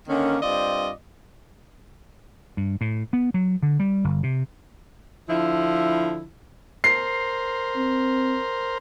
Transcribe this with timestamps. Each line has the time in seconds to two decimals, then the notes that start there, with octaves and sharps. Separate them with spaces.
0.08 D3 D#3 A#3 C#4
0.42 G2 C4 F4 D5 D#5
2.57 G2
2.81 A2
3.13 B3
3.34 F#3
3.63 D3
3.80 G3
4.04 G1
4.23 C3
5.29 D3 F3 E4
6.84 A#4 C5 C7
7.77 C4